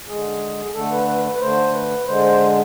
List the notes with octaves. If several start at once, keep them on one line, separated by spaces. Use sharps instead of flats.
D3 G#3 G#4
D3 A3 A4
B4
B4
B4
B4
D3 A3 C5
B4
D3 G#3 C5
C5